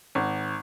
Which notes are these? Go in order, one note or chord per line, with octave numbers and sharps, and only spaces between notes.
G#1